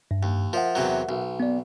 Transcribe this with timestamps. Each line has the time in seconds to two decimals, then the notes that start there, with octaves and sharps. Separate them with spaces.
0.11 G2
0.23 D#2
0.53 F3 A#4 E5 F#5
0.75 E2 C3 F#3
1.09 B1
1.40 B3 D5